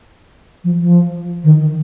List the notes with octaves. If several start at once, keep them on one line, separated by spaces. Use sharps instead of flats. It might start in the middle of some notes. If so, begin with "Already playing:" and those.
F3
F3
D#3
D#3